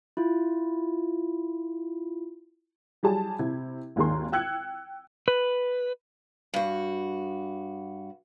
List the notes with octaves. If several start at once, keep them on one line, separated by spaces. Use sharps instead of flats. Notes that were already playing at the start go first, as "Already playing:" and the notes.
E4 F4
F#3 G3 G#4 A5
C3 E4 G#6
G#1 D#2 D#3 G#4 A#5 C6
G5 E6 F#6 G#6 C#7
B4
G2 F#4